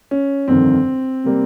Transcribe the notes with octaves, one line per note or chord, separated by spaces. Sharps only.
C#4
G1 F2 C3 D#3 C4
C3 G3 A#3